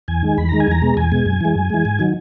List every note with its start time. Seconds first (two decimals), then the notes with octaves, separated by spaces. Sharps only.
0.08 E2 G#5
0.23 D#3 G#3
0.38 E2 B5
0.49 D#3 G#3 A#5
0.60 G#5
0.68 E2 A#5
0.82 B2 G#3
0.97 E2 G#5
1.12 B2 G#3
1.26 F#2
1.41 E3 G#3
1.55 F#2
1.70 E3 G#3
1.85 G#2
1.99 D#3 F#3